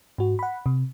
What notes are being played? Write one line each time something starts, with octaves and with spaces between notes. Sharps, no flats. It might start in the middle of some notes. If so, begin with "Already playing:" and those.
G#2 F#4
F#5 B5
C3